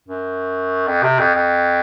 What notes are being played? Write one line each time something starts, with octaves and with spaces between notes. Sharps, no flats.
F#2
F2
C3
F2
F2